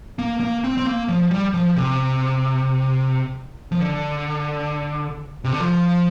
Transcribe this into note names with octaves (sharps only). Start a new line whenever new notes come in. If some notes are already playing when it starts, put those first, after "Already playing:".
A#3
A#3
C4
C4
A#3
F3
G3
F3
C3
F3
D3
C3
D3
F3